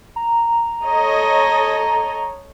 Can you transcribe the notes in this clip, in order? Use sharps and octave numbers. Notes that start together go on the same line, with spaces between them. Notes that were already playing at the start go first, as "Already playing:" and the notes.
A#5
A4 C#5 D#5